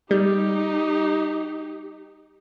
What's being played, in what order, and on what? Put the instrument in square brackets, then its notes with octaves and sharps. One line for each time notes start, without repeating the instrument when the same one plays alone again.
[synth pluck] G3 [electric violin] D#4 G4